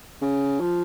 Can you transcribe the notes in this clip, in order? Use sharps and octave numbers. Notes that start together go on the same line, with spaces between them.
C#3
F3